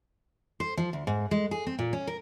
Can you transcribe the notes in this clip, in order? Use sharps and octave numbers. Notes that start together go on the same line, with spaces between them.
C5
F3
D2
G#2
G#3
G#4
C4
A#2
C#4
A#4